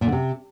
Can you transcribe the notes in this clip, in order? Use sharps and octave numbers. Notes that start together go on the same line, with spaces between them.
A#2
D3
C3